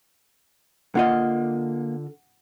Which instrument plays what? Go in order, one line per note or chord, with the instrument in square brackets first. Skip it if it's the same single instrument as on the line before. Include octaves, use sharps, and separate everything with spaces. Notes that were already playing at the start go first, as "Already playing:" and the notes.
[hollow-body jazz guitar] D3 F4 D#5 [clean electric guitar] A#3 [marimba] F#5